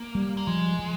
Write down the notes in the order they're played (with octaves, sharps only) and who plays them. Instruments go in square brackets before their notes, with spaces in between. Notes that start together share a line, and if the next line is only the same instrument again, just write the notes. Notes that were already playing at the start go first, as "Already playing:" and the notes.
Already playing: [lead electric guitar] A#3
[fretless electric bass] G3
[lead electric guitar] A#3
[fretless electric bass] F3 [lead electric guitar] G#3
[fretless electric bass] F3